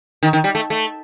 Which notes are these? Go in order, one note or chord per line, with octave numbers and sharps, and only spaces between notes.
D#3
D#3
G3
A3
A3